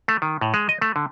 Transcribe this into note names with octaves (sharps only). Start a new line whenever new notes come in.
A3
D#3
A2
G#3
D#5
A3
D3